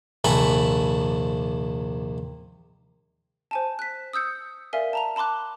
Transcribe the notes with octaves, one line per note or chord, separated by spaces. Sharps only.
A#1 D#2 C3 A4 G#5 B5
C5 G#5 A5
F#6 B6
D#6 E6 G6 C#7
A#4 D5 E5 F5 G#5
A5 A#5 F7
A5 B5 C6 D6 F#6